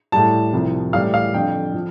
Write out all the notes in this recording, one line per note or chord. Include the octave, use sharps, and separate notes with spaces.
A2 G3 A5
C2 C3 F3
A2 E3 G3 F5
F5
F2 D3 G3 G5
F3